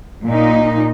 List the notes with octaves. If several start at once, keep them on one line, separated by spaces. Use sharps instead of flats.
A#2 D#4